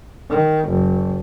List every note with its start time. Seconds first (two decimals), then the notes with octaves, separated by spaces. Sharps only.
0.30 D#3
0.69 F#1